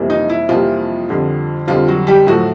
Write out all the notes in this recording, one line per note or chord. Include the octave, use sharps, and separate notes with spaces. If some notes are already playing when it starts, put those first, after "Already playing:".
Already playing: F2 C3 E3 G3 A#3
D#4
E4
F2 C3 E3 F3 G3 A#3 F4
F2 D3 G3
F2 D3 F3 G3 F4
F#3 F#4
G3 G4
A2 F3 F#3 A3 F#4